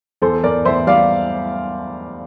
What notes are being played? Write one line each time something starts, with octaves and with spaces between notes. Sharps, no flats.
E2 A4 C5
E2 A#4 D5
E2 C5 E5
G3 D5 F5